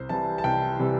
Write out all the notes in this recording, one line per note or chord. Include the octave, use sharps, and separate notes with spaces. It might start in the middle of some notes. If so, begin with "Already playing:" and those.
Already playing: C2 C5
C3 E3 G3 A5
A5
C2 G5
C3 E3 G3